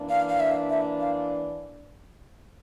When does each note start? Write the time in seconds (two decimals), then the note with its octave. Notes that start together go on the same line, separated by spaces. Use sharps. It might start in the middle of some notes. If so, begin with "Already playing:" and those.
Already playing: E3 A#3 D4
0.09 F5
0.29 F5
0.40 E5
0.70 E5
1.00 F5